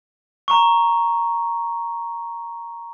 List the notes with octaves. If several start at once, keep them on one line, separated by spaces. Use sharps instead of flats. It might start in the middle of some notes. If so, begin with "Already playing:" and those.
A#5 C#6